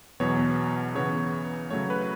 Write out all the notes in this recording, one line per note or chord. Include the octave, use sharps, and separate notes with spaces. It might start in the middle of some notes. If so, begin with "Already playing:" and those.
E2 B2 F#3 B3 C#5
C#3 E3 B3 C#5
C#3 F#3 A3 C#5
B4